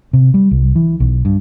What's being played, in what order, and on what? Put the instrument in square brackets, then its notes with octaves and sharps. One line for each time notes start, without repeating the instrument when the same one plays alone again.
[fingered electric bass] C3
G3
C2
E3
B1
G2